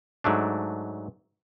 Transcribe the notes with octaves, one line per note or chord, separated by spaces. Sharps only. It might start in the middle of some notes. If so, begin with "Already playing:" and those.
G#2 F#3 A3 D4